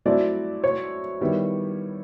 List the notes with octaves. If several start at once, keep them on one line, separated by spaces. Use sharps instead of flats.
F#3 A3 C4 E4 D5
C#5
D#3 G3 B3 E4